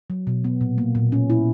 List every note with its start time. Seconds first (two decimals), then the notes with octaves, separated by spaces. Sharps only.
0.10 F#3
0.27 B2
0.44 B3
0.61 A#2
0.78 A#3
0.95 A#2
1.12 C#4
1.30 E4